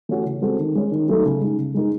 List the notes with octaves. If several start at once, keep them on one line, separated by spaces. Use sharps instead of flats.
E3 A3 C#4 F#4
C#3
G#3 C4 F#4 A4
D#3
G#3 C#4
D#3
F#3 A3 D#4 A4
C#3
G#3 D#4
C#3
G#3 D#4 G#4